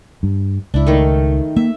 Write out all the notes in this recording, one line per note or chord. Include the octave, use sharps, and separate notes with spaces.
G2
C#2 D4 E4
D#3 A3
A#3 E5